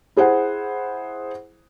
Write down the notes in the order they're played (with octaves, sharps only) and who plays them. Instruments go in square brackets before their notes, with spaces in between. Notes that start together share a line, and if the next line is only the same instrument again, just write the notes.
[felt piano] E4 G#4 C5 F#5